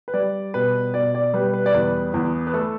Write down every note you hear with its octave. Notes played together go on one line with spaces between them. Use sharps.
B4
G3 D5
B2 B4
B2 D5
D5
G3 B4
B4
D5
E2 B4
E2
B4
A3 A4